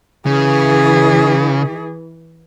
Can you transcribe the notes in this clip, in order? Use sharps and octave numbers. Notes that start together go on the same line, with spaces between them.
C#3 E3 G#4